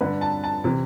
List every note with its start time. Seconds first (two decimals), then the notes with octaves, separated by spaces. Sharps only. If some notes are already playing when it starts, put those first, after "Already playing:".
0.01 G2 D3 B4
0.21 A5
0.44 A5
0.64 C3 E3